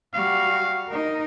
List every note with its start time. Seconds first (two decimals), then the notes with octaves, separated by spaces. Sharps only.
0.14 G3 F#4 F5
0.89 D#4 A#4